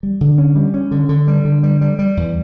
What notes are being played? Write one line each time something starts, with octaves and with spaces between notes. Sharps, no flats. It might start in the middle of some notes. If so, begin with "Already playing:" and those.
G3
D3
C#4
G3
C#4
D3
D3
G3
D3
G3
G3
G3
E2